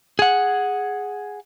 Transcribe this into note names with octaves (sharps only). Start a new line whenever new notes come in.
G#4 F#5